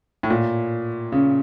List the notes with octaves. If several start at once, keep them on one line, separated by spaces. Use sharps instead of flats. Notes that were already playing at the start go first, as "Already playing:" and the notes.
A2
A#2
C#3